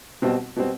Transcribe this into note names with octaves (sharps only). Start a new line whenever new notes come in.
B1 B2 G3 C4
B2 G3 C4